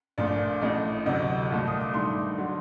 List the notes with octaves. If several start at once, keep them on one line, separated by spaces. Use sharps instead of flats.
A#1 A#2 A3 D5
A1 A2 A3 D#5
D2 C3 F#3 D#5
C2 A#2 A3
D#6
D6
G2 D#3 A3 C6
D3 F#3